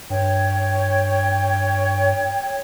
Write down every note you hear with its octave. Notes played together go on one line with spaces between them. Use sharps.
G2 C#5 G5